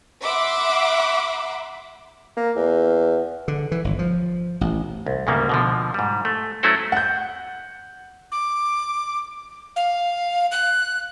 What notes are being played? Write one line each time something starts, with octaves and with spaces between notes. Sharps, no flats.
E5 F#5 B5 C6 D6 E6
A#3
E2
D3
E3
G1
F3
A1
C2
D2 G#2 C#3 G3 A#3
B2 D3 F3
G#2 G3
A3
F#3 A3 C#4 E4 F#4 C5
F#5 G6
D6
F5
F#6